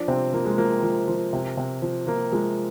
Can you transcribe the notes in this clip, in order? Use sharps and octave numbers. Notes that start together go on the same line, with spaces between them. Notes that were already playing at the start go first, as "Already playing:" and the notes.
Already playing: F3 D4
C3 C4
F3 A#3
G#3
F3 A#3
F3
F3
C3
C3
F3
F3 A#3
F3 G#3